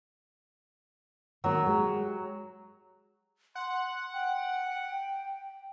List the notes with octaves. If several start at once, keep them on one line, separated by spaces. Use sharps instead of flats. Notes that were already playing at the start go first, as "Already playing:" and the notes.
D#3 F#3 A#3 A#4
G#3 G4
F#5 C6
G5